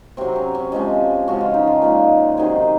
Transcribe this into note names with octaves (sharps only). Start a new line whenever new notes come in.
C3 F#3 C4
C#4
C#4
C3 F3 G#3 C#4
C#3 F3 G#3 F#4
F4
D#4
F4
A#2 F3 G#3
C3 D#3 F#3 G#4